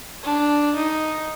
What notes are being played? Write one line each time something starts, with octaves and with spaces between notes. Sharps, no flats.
D4
D#4